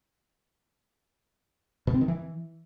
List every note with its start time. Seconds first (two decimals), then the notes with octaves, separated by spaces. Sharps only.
1.87 B2
1.94 C4
2.01 D#3
2.08 E3